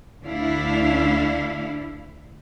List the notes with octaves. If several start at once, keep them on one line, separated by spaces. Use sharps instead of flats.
D2 D4 E4 F5